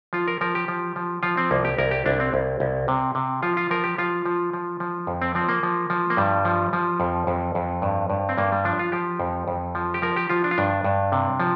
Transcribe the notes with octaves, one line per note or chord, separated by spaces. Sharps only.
F3 F4
A#4
F3 A#4
G4
F3
F3
F3 F4
C4
C2 A#3
G4
C2 A#4
G4
C2 D4
C4
C2
C2
C3
C3
F3 F4
F4
F3 A#4
G4
F3 F4
F3
F3
F3
F2
C4
F3 C4
A#3
F3
F3
A#3
G2 G3
F3
F3
F2
F2
F2
G2
G2
C4
G2 A#3
G3
F3 D4
F4
F3 G4
F2
F2
F3
G4
F3 A#4
G4
F3 F4
D4
F4
G2 D4
G2
C3
F3